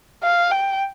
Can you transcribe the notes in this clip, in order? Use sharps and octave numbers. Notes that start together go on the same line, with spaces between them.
F5
G5